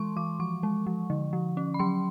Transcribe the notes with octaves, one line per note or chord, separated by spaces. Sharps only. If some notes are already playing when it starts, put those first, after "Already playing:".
Already playing: E3 G#3 C6 C#6
E3 D6
F3 C#6
G#3
F3
D3
F3
C#4
B5
F#3 C6